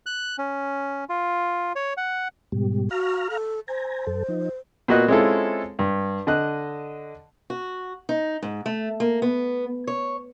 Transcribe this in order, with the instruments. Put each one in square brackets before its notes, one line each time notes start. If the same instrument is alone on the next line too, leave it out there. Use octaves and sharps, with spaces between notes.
[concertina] F#6
C#4
F4
C#5
F#5
[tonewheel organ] G#2 B2 G3
[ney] F#4 [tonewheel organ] F5 A#5 F6
[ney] A4
[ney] C5 [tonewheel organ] G#5 A#5
[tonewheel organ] F#2 A4
F3 D#4
[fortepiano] A#2 B3 F#4 D#5 F#6
G#3 C4 C#4 E4 F4 A4
G2
D3 D#5 F#6
[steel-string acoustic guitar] F#4
D#4
G#2
A3
A#3
B3
C#5